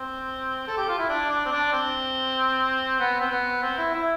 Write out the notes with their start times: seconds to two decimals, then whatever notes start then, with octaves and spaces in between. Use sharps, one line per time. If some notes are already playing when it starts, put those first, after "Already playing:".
Already playing: C4
0.68 A4
0.78 G4
0.89 F4
0.99 E4
1.09 D4
1.30 D4
1.46 C4
1.52 D4
1.73 C4
3.00 B3
3.20 C4
3.30 B3
3.62 C4
3.78 E4
3.94 E4